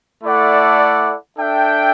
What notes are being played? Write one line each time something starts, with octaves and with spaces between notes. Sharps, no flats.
A3 E4 A4 D5 F#5
D4 A4 E5 G5